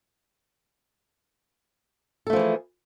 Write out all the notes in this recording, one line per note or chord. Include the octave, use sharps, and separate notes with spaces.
E3 F3 A3 G#4 A4